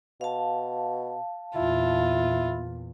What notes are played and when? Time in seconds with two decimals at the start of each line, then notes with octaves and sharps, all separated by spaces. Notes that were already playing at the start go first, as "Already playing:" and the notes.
0.21 B2 F5 A5
1.56 E2 A#2 E4 F4